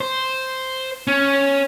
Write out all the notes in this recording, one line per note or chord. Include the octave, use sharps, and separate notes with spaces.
C5
C#4